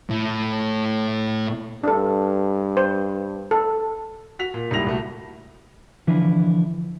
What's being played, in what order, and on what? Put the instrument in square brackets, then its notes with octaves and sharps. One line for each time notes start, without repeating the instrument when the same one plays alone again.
[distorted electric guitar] A2
[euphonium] G2 [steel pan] D4 A4
[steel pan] C5
A4
[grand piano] F#4 B6 F7
A#2
D#1 G#2 G3 E4 A#6 F7
C2 A3 F#4
[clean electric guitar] D3 E3 F3 D4 E4